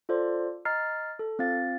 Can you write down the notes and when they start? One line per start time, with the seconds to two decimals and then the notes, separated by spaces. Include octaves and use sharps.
0.09 F4 A4 C5 D5
0.65 D#5 A#5 F6 A6 C7
1.19 A4
1.39 C4 F4 F5 A6